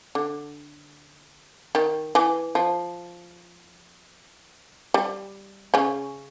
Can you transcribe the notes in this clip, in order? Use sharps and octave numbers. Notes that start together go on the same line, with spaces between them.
D3
D#3
E3
F3
G3
C#3 C#4